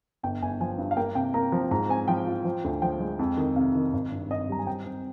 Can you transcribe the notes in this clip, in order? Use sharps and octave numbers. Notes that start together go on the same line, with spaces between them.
G1 G5
G1 G#5
F3 G#5
G2
F5
A#3 G5
C3 G5
A#3 A#5
F3
G#2 A#5
C4 G#5
F3 G5
F4
F3
D2
F3 G5
G#3
F2
D#3
C3 F5
D#3
G#1
G2
G2 D#5
G3 A#5
G#5
C4 G5
C4